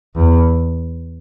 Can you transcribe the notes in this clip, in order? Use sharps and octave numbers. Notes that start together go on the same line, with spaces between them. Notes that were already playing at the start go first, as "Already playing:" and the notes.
E2